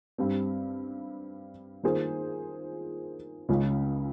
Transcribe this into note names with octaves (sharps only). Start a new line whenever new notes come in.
G2 G3 C4
D#3 A#3 F4 G#4 C5
C#2 C#3 G#3 C#4 F4